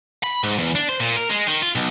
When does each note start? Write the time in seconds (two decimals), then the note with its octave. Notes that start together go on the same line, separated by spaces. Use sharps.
0.23 B5
0.44 G#2
0.59 E2
0.75 D4
0.89 C5
1.00 A#2
1.16 A#4
1.29 G#3
1.47 D#3
1.62 F4
1.75 B1